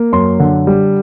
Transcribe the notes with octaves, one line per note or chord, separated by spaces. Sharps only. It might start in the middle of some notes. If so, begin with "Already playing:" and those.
Already playing: A#3
F#2 C6
D3
G3